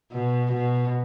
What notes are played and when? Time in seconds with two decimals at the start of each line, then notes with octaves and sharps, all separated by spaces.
0.12 B2
0.52 B2